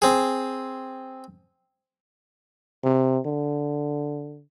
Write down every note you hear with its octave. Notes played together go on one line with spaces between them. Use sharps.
C4 G#4
C3
D3